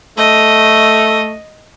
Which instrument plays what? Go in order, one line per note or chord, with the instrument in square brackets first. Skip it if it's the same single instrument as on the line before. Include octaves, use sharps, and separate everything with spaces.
[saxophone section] A3 [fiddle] D#5